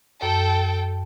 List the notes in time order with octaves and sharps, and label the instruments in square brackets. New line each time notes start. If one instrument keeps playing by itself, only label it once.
[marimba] F#2 [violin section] A4 G5